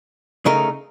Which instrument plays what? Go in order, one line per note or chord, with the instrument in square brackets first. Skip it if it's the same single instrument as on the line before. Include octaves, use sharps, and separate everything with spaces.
[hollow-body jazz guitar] C#3 A3 D#4 A#4